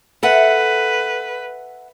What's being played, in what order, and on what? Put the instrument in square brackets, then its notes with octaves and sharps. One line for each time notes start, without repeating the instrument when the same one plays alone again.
[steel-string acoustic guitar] A4 E5 F#5 [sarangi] B4